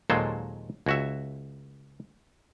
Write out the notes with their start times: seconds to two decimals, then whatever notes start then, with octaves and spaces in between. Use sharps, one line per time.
0.10 D#2 A#2 F#3 G#3 A4 C5
0.86 C#2 F#4 E5